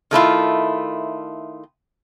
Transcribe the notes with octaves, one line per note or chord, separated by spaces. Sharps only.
D#3 A3 E4 F4